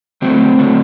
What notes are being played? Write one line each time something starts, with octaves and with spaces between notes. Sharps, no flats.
D3 F#3 A3 C4
D3 F#3 A3